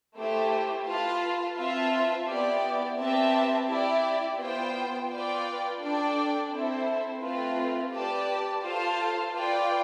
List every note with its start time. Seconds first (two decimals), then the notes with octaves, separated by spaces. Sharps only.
0.16 A3 E4 G4 C5
0.86 F4 B4 F5 A5
1.57 C4 F4 B4 E5 A5
2.28 B3 E4 G4 D5
2.98 C4 G4 B4 E5 A5
3.69 E4 G4 D5
4.39 B3 F4 C5 G5
5.10 F4 B4 D5 G5
5.81 D4 A4 D5 G5
6.51 C4 E4 A4 C5
7.22 A3 C4 F4 B4
7.92 G4 B4 D5 A5
8.63 F4 A4 C5 F5 A5
9.34 F4 B4 D5 G5